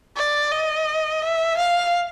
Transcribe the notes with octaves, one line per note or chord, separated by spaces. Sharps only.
D5
D#5
E5
F5